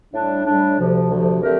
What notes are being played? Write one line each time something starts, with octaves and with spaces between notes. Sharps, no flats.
A2 G3 D4
A2 G3 D4
D2 C3 F3
D2 C3 F3
D3 A3 C4 G4 A#4